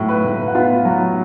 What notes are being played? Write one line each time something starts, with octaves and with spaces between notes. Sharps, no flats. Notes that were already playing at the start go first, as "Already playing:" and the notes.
Already playing: A2 F#3
B4 B5
A2
F#5
B3 F4 F5
F#3